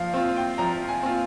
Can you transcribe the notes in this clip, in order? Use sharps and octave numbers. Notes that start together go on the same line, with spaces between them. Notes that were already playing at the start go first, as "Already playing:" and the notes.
Already playing: F3 F5
C4 F4
G5
F3 A#5
G#5
C4 F4